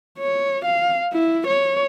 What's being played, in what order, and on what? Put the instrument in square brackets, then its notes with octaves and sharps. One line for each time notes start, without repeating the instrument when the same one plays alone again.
[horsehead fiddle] C#5
F5
E4
C#5